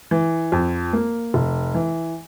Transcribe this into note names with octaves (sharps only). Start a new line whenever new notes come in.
E3
F2
A#3
F1
E3